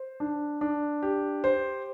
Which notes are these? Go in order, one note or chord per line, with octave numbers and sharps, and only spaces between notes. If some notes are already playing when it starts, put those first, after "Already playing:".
Already playing: C5
D4
D4
G4
C5